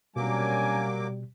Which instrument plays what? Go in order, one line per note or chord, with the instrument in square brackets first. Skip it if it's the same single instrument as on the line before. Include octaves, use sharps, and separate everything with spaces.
[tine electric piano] B2 [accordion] F#3 A#3 D6 [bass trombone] G3 [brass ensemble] C#4 D4 G#5